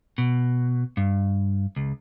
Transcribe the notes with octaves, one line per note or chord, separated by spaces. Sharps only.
B2
G2
C#2